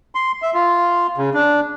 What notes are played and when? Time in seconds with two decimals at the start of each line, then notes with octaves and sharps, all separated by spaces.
0.15 C6
0.42 E5
0.54 F4
1.17 C#3
1.34 D4